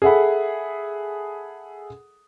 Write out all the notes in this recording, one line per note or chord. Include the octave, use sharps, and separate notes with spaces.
G#4 A4 E5 F#5 B5